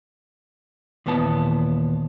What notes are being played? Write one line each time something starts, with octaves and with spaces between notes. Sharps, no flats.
D#2 A#2 E3 B3 A5